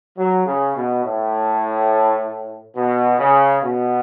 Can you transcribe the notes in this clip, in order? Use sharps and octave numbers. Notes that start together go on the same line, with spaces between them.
F#3
C#3
B2
A2
B2
C#3
B2